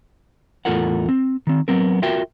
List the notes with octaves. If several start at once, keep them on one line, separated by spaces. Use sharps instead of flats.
E2 A2 F4 A4 A#4 F#5
C4
D#3 C4
F#3 B3 C4 A#4
F4 F#4 A#4 E5 G5